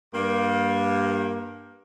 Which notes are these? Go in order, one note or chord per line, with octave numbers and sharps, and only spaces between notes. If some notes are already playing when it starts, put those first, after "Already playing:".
G2 A#3